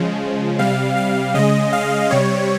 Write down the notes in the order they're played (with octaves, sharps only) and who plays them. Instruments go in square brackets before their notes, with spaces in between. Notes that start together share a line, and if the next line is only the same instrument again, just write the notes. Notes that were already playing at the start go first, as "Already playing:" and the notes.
Already playing: [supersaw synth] C#3 F3 G#3
C3 G3 F5
F5
C#3 G#3 D#5
F5
C3 G3 C#5